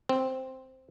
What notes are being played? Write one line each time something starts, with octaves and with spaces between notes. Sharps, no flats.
C4